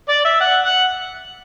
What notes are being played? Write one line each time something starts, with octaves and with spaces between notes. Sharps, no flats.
D5
E5
F#5
F#5